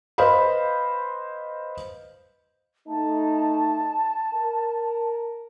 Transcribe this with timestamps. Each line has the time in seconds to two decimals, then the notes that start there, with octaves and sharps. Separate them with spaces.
0.18 B4 C5 D#5 F5 B5
2.88 A3 D#4 A5
4.35 A#4